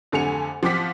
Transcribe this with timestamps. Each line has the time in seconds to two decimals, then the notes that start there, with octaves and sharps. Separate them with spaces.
0.12 F2 D3 A3 G#5 C#7 F7
0.63 F3 C4 F#5 D6 B6